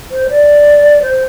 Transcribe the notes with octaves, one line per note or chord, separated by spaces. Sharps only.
C5
D5
C5